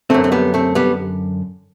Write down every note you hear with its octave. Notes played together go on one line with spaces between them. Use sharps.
F#2 D3 A3 C4
C4
G3 B3
A3 C4
G3 B3